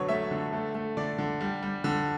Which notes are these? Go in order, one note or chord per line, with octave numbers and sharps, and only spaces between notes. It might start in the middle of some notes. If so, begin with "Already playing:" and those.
Already playing: B2 D3 F#3 B4 C#5
A3 E5
D3
A3
A3
D3 D5
D3
G3
G3
D3